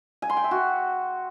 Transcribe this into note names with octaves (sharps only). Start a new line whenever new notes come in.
G#5
C6
G5
E5
F#4